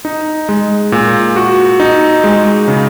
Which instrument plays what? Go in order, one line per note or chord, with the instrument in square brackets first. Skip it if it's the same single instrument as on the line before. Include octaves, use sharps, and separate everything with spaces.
[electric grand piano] D#4
G#3
A#2
F#4
D#4
G#3
C#3